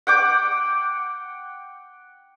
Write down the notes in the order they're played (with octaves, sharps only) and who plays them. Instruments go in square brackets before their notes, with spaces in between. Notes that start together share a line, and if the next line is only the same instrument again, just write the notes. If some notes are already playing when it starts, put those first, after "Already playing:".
[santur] F#5 G5 D6